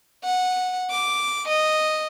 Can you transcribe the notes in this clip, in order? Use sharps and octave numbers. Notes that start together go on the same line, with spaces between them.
F#5
D6
D#5